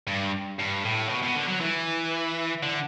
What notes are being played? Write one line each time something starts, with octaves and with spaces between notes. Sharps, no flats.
G2
G2
A2
B2
B2
D3
F#3
E3
D3